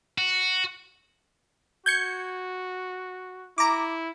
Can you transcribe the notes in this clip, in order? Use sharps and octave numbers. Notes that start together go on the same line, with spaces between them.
F#4
F#4 G6 G#6 C#7
E4 A#5 D6